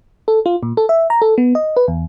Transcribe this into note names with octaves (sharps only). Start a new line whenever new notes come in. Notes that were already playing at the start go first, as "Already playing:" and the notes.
A4
F4
A#2
A4
E5
A#5
A4
B3
D#5
B4
E2